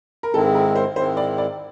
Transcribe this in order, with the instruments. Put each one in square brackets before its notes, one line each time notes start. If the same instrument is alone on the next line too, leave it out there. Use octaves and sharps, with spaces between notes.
[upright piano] A#4
[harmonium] G#2 D#3 G#3 C4 E4 [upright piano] A4
[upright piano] A#4
C5
[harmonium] G#2 D#3 G#3 C4 E4 [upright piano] C5
[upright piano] D5
D5